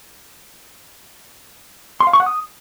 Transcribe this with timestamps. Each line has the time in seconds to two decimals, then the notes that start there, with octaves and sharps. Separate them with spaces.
2.00 C6
2.07 F5
2.13 C#6
2.20 F#5
2.26 D#6